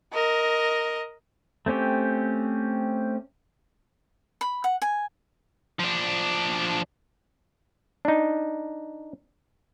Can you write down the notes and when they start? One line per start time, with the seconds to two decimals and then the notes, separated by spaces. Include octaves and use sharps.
0.13 A#4 D#5
1.66 A3 C4 C#4 G4
4.41 B5
4.64 F#5
4.82 G#5
5.80 F3 D4
8.05 D4 D#4